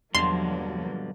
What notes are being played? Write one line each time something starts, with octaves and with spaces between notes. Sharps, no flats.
E2 G2 B2 D3 F3 F#3 A#3 C6